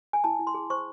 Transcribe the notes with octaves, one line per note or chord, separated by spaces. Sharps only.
G#5
E4 A5
E4
C6
G#4
C5 C#6